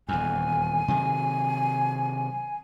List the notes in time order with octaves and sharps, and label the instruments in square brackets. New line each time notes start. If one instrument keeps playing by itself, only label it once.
[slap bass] D#1 E2 [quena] G#5
[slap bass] C3 D#3 F#3